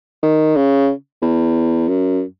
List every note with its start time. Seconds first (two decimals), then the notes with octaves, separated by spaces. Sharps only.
0.23 D#3
0.56 C#3
1.22 E2
1.88 F#2